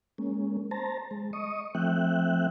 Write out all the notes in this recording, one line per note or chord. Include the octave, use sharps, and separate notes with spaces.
G#3 A#3 C#4
C5 A5 A#5
G#3
D#5 C#6 D#6
F3 A3 C4 E5 G5 F#6